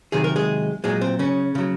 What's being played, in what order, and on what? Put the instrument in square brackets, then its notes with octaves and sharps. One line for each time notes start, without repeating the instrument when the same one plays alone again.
[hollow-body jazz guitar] C3 D#3 F#3 G#4
A#4
G#3 G#4
A#2 F#3 G#3 G#4
C4
C#3 C#4
C#3 F#3